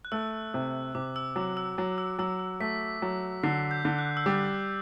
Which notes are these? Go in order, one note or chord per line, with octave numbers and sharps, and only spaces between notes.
F#6
A3 E6
C3
C3 D6
E6
F#3 D6
E6
F#3
E6
F#3 E6
E6
A3 B6
F#3
D3 C7
G6
D3
F#6
E6
G3 D6